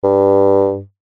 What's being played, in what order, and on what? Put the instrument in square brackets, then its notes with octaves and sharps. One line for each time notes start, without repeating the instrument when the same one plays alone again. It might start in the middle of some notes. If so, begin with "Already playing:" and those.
[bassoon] G2